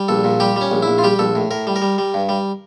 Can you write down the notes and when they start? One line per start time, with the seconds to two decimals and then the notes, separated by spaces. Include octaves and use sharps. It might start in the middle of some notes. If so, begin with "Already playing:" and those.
Already playing: G3
0.08 A#1 A4
0.24 A#2
0.40 G3 G4
0.56 G3 C#4
0.71 A#1
0.82 E4
0.88 A#1
0.98 F4
1.03 G3 G4
1.19 A#1 A4
1.35 A2
1.51 A2 A#4
1.67 G3
1.76 A#4
1.82 G3
1.98 G3
2.14 G2
2.29 G3